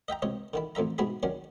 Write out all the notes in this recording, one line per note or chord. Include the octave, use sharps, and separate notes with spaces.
D#5 E5 G5 A#5
C#2 C3 C#5 D#5
D3 D#3 E4
A1 F2 D3 E5 A#5
G#2 B2 E4 F#4 G#4 B5
D#3 F#3 C#4 D4